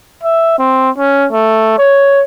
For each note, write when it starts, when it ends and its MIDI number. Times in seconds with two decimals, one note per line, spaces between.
0.23 0.57 76
0.59 0.90 60
0.98 1.27 61
1.33 1.77 57
1.79 2.24 73